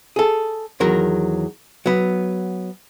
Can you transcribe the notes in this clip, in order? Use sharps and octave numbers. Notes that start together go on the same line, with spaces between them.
G#4 A4
E2 D#3 F#3 A#4
F#3 B3